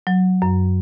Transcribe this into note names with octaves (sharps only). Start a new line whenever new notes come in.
F#3
F#2